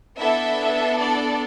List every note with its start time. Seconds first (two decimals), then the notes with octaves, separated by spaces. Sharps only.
0.18 B3 D4 E4 A4 E5
0.99 D5